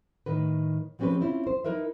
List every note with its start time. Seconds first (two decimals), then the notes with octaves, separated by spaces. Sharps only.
0.26 A2 D#3 B4
0.99 F3 G#3 C4 C#4 G4 B4
1.20 C4 C#4 E4 F4
1.47 C5
1.64 D#4 E4 A#4 B4 E5